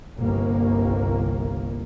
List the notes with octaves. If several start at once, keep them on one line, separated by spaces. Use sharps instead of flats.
G1 C2 A#3